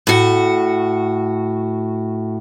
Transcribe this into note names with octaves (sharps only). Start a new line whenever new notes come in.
A2 F#4